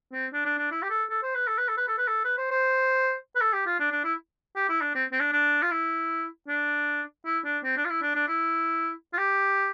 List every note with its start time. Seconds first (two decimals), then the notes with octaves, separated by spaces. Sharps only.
0.13 C4
0.33 D4
0.45 D4
0.58 D4
0.71 E4
0.82 G4
0.90 A4
1.10 A4
1.23 C5
1.35 B4
1.47 A4
1.58 B4
1.68 A4
1.77 B4
1.88 A4
1.98 B4
2.08 A4
2.25 B4
2.38 C5
2.51 C5
3.36 B4
3.41 A4
3.53 G4
3.66 F4
3.80 D4
3.92 D4
4.04 E4
4.56 G4
4.69 E4
4.81 D4
4.95 C4
5.12 C4
5.20 D4
5.32 D4
5.62 F4
5.71 E4
6.48 D4
7.25 E4
7.45 D4
7.64 C4
7.77 D4
7.85 F4
7.90 E4
8.02 D4
8.15 D4
8.28 E4
9.13 F4
9.18 G4